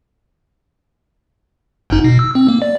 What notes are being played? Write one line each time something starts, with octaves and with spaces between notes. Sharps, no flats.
G1 F#2 D#4
B2
E6
C4
A#3
D5